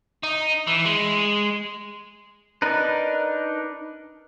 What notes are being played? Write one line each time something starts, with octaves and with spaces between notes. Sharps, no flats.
D#4
E3
G#3
D4 D#4 A#4 B4